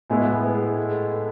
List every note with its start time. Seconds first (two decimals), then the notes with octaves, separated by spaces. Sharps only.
0.10 A2 G#3 B3 E4 G#5
0.20 E5
0.32 G#5
0.43 B4
0.55 G#4
0.66 G#4
0.78 A4
1.11 A4